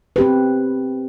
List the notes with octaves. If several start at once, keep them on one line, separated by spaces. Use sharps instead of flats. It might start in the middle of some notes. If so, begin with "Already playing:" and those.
C4 G4 B4